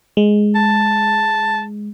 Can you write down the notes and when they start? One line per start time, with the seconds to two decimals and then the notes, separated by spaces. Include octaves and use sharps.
0.17 G#3
0.55 A5